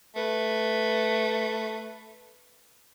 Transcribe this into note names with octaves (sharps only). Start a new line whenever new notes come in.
A3 B4